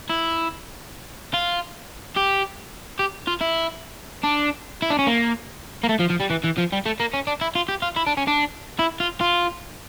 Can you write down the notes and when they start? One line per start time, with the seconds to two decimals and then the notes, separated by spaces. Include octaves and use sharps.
0.09 E4
1.34 F4
2.17 G4
2.99 G4
3.27 F4
3.41 E4
4.24 D4
4.82 E4
4.90 D4
4.99 C#4
5.07 A#3
5.84 A#3
5.89 A3
6.00 F3
6.10 F3
6.20 G3
6.31 E3
6.44 E3
6.58 F3
6.73 G3
6.86 A3
7.00 A#3
7.14 C#4
7.27 D4
7.41 E4
7.55 F4
7.69 G4
7.82 F4
7.96 E4
8.07 D4
8.17 C#4
8.27 D4
8.79 E4
9.00 F4
9.21 F4